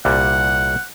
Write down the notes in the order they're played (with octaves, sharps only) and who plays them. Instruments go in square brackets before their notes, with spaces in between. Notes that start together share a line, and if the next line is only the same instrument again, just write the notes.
[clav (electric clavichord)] C2 A#2 G3 [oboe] F#5